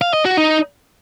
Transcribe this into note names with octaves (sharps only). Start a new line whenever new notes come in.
F5
D#5
F#4
D#4